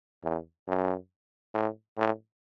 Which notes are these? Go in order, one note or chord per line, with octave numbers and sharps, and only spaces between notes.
E2
F#2
A2
A2